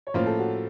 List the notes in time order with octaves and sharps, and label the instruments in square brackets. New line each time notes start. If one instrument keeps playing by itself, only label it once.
[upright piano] C#5
[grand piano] A2 F3 A#3 C#4 F4 [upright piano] C5
[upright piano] A4
F#4